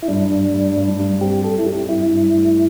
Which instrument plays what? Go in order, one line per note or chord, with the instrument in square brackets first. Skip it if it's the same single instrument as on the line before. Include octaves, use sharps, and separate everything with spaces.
[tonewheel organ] E4
[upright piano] G2 [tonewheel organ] D4
[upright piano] G2
G2
G2
G2
[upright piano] C4 [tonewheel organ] G4
[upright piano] G2 [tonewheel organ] A4
[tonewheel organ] E4
[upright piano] C4 [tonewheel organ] G4
[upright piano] G2 [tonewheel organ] E4
[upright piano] G2
A3